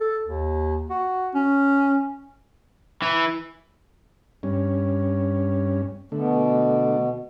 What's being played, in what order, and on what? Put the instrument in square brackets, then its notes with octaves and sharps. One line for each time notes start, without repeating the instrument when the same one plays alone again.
[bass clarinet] A4
D#2
F#4
C#4
[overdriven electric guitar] E3
[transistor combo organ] G2 C#4
[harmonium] B2 [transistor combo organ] D3 A3